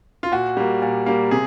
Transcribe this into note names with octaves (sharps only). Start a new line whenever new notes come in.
F4
A#2 F#4
G3 A#3
A#2
G3 A#3
C3 G#4